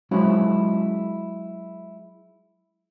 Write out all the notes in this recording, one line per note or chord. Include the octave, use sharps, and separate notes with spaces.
F#3 G#3 C#4 E4 F#4 C5